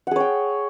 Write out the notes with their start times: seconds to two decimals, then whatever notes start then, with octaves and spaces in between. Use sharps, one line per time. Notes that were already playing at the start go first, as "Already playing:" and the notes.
0.07 F#5
0.11 G#4
0.16 C#5
0.20 G5